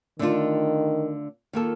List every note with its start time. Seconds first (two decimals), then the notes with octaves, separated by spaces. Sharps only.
0.19 D3 D#3 A3 D4 F4
1.53 D#3 A#3 F4 A4